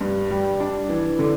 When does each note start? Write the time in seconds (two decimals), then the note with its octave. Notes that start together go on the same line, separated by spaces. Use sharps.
0.01 G2
0.31 G3
0.60 D4
0.89 E3
1.19 D3